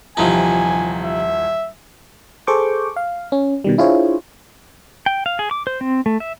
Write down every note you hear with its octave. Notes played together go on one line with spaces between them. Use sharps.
D#1 C3 E3 F3 D#4 G#5 A5
E5
G#4 A4 C5 C#6 D6 G6
F5
C#4
B2 D#3 G3
D4 E4 F4 G#4 C5 C#5
G5
F5
G#4
D6
C5
C4
A3
E5